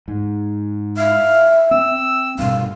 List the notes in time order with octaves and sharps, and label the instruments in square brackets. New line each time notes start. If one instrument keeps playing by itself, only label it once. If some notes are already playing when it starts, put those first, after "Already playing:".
[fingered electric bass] G#2
[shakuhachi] E5 [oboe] F5
[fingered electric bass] C4 [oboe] E6
[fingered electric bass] G2 B2 [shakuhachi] F5